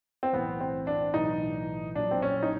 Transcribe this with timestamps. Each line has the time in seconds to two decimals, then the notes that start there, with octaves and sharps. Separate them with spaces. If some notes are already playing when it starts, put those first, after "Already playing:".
0.23 C4
0.33 B1 A2 E3 B3
0.61 C4
0.87 D4
1.14 B1 A2 E3 D#4
1.95 A#1 A#2 F#3 D4
2.11 C4
2.22 C#4
2.43 D#4